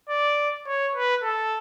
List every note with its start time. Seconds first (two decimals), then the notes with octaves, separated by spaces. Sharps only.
0.10 D5
0.67 C#5
0.95 B4
1.24 A4